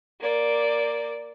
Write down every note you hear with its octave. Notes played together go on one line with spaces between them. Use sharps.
A#3 D5